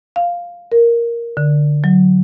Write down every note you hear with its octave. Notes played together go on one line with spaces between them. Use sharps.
F5
A#4
D3
F#3